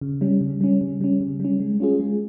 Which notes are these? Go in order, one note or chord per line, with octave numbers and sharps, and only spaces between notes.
C#3
G3 C#4
C#3
G3 C#4
C#3
G3 C#4
C#3
G3 C#4
G#3
C#4 F4 G#4
G#3